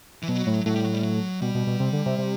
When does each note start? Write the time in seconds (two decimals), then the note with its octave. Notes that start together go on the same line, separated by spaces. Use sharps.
0.23 E3
0.28 B2 F#3
0.47 A2
0.66 A2 F#3
0.75 G3
0.84 F#3
0.94 G3
1.03 F#3
1.42 B2 G3
1.55 B2
1.67 B2
1.80 C3
1.93 D3
2.06 C3
2.19 C3